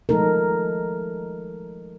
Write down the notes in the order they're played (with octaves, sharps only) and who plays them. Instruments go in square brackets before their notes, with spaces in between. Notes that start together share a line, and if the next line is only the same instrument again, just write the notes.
[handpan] F3 G#3 A3 D#4 A4 A#4